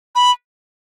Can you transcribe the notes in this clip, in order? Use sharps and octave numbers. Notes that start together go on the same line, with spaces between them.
B5